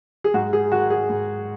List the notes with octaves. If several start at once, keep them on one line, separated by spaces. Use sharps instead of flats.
G#4
G#2 F#4
G#4
D#3 F#4
G#4
G#2